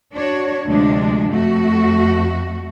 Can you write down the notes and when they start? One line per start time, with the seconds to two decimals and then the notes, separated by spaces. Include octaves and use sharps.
0.13 D4 F#4 C#5
0.66 D2 C3 F3 G#3 D4
1.29 F2 A3 F#4